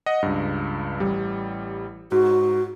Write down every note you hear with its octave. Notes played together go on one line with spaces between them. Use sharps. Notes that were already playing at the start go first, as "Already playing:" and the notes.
D#5 F#5
C#2 G2
A1 G3
G#2 F#4